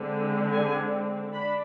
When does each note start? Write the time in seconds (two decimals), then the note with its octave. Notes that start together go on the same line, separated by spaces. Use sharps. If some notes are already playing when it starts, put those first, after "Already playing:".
Already playing: D3 G#3 C4
0.51 G#5
1.32 D4 B5